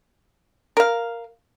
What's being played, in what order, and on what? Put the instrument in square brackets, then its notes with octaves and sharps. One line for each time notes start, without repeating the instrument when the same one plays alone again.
[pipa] A#4 F5